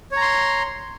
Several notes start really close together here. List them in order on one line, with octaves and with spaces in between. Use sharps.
C#5 A#5 C6